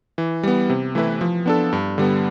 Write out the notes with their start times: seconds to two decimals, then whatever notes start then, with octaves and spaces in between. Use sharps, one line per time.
0.18 E3
0.43 G3 B3
0.69 C3
0.95 E3 A3 E4 B4
1.21 F3
1.46 B3 D4 A4
1.73 G2
1.98 D3 G3 B3